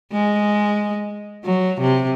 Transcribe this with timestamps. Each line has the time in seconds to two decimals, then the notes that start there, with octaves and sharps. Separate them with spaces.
0.12 G#3
1.45 F#3
1.80 C3